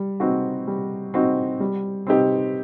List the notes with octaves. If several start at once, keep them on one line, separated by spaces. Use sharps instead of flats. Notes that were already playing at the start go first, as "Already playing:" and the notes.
Already playing: G3
C4 D#4 F#4
G3
C4 D#4 F#4
G3
C4 D#4 G4